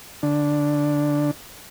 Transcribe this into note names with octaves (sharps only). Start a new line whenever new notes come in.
D3 D4